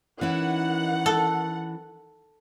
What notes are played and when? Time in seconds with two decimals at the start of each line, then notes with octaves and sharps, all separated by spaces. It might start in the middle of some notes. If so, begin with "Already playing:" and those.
0.21 D#3 E3 C#4 E4 F#5
1.06 A4